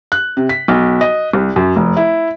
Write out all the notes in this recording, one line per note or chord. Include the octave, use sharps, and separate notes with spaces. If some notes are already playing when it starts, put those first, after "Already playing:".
F#6
C3
B6
B1
D#5
C2
F#2
F1
E4